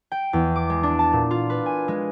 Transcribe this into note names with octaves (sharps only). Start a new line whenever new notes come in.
G5
E2
D6
G#3
D4
A5
A#2
F4
B4
G#5
G#3